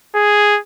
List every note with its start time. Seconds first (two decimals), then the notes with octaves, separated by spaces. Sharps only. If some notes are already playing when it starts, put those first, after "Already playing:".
0.16 G#4